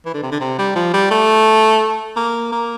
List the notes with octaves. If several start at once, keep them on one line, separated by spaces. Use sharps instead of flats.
E3
D3
C3
D3
C3
G3
F3
G3
A3
A#3
A#3